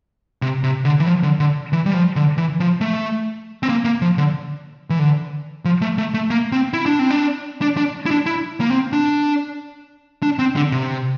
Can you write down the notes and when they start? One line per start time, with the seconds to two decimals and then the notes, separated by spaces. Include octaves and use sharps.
0.42 C3
0.64 C3
0.85 D3
1.00 E3
1.07 F3
1.23 D3
1.40 D3
1.73 E3
1.86 G3
1.94 F3
2.16 D3
2.38 E3
2.60 F3
2.81 A3
3.63 C4
3.69 A#3
3.85 A#3
4.02 F3
4.18 D3
4.90 E3
4.99 D3
5.65 F3
5.81 A3
5.98 A3
6.14 A3
6.30 A#3
6.52 C4
6.73 E4
6.86 D4
6.99 C4
7.11 D4
7.61 D4
7.77 D4
8.06 E4
8.11 D4
8.26 E4
8.61 A#3
8.70 C4
8.93 D4
10.23 D4
10.39 C4
10.56 D3
10.72 C3